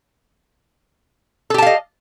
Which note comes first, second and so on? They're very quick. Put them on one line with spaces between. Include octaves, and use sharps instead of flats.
A4 G4 A5 F5 D#5